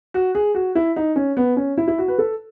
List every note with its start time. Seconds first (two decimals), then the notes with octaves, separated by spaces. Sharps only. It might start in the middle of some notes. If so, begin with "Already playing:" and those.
0.14 F#4
0.35 G#4
0.55 F#4
0.75 E4
0.96 D#4
1.16 C#4
1.37 B3
1.57 C#4
1.78 E4
1.88 E4
1.98 F#4
2.08 B4
2.19 A4